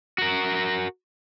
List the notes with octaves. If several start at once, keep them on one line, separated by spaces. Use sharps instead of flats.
F#4 A#4